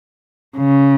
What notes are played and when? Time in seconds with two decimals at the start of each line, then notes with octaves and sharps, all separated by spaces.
0.57 C#3